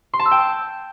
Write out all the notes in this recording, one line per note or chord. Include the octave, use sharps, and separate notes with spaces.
C6
A5
E6
G5